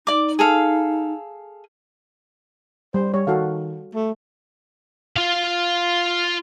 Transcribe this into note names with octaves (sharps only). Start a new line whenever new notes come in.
D#4 D5 D6
G#4 A4 F5
G3 C5
G3 C#5
D#3 F#4 A4 F5
A3
F4 F5